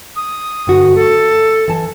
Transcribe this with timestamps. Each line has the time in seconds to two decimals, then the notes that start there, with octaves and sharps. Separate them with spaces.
0.16 D#6
0.67 G2 D3 F#4
0.95 A3 A4
1.68 E3 A5